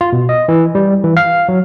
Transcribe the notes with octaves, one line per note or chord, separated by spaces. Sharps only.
F4
B2
D#5
E3
G3
E3
F5
F#3